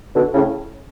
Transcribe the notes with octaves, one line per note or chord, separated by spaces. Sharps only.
B2 D3
A2 C#3